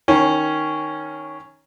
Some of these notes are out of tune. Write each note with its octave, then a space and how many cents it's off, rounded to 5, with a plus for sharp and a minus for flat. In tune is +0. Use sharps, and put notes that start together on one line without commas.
D#3 +0 C#4 +0 C#5 -30